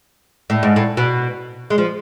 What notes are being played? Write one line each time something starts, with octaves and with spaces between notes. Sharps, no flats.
A2
G#2
A2
B2
G#3
F3